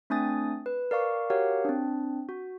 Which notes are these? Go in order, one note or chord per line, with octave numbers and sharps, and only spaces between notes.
A3 C4 D4 G#5 D#6 A6
B4
A#4 D5 F5 C#6
F#4 G4 A#4 C#5 F5 F#5
C4 D4
F#4